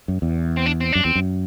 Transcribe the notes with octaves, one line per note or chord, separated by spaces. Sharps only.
F#2
E2
C4
D4
C4
F#2 D4
E2 C4
F#2